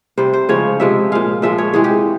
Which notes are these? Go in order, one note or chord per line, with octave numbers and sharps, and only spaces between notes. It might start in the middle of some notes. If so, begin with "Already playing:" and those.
C3 G3 C5
C5
C#3 F3 G#3 C#5
C3 F3 G#3 E5
A#2 G#3 F5
A#2 F3 G#3 E5
C#5
C3 E3 G#3 G#4
G4